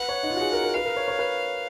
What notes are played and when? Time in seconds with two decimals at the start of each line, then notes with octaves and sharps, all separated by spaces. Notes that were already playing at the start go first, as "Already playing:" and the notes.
Already playing: B4 F#5
0.09 C#5
0.23 D#4
0.30 F4
0.36 F#4
0.41 G#4
0.52 A#4
0.63 A#4
0.74 B4 F5
0.85 A#4
0.97 C#5
1.08 C#5
1.19 B4